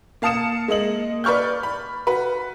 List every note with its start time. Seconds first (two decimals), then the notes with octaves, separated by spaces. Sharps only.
0.22 A#3 F5 A5 D#6 C#7 E7
0.68 G#3 A#3 D#5 F#7
1.24 B4 D5 C#6 F6 G6
1.63 B5
2.07 F#4 B4